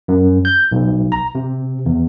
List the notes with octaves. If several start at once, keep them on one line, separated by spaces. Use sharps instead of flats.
F#2
G6
B1
A#5
C3
E2